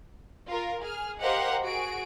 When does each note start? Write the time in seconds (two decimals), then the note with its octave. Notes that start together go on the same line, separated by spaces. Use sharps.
0.47 F4 A#4
0.83 G#4 F6
1.19 G4 A#4 C5 D#5 F5 F#5
1.63 F#4 G#4 D7